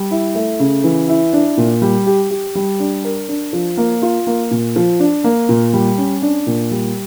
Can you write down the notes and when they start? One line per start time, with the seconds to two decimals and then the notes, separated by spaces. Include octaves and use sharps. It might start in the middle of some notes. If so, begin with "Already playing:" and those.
Already playing: G3
0.11 E4
0.35 A3
0.60 C#3
0.84 E3
1.08 E4
1.33 D4
1.57 A#2
1.82 G3
2.06 G4
2.30 G4
2.55 G3
2.80 D4
3.04 A#4
3.29 D4
3.53 F3
3.77 A#3
4.02 F4
4.27 A#3
4.51 A#2
4.76 F3
5.00 D4
5.24 A#3
5.49 A#2
5.73 G3
5.98 C#4
6.22 D4
6.47 A#2
6.71 G3